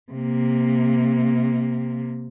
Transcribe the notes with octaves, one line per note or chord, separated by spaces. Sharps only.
C3 A#3